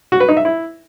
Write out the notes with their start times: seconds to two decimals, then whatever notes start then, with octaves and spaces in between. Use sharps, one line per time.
0.12 F#4
0.20 B4
0.28 D#4
0.37 E5
0.45 E4